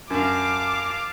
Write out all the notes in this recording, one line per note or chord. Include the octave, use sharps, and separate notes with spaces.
F#2 F5 A5 D6